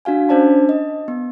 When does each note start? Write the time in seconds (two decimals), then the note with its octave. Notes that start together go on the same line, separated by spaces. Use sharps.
0.05 D4 F#4 F5 G#5
0.29 C#4 D4 C5 D5 A5
0.69 D#5
1.08 B3